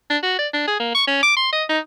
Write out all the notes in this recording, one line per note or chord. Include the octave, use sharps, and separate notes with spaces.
D4
F#4
D5
D4
G#4
A#3
C#6
C#4
D6
C6
D#5
D#4